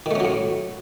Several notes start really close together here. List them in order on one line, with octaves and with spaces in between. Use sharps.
D#3 A3 C#4 F#3 A2